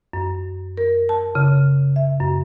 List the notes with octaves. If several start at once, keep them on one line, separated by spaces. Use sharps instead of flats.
F#2
A#4
A5
C#3
E5
F#2